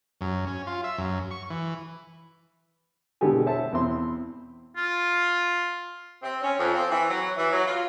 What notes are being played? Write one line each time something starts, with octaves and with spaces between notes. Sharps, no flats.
F#2
C#4
F4
E5
F#2
C#6
E3
B2 D3 G#3 G4 A4 G#5
C5 C#5 E5 A5
E2 C4 E4 C6
F4
C4
C#4
F2
C4
E3
F#3
E3
F#3
F4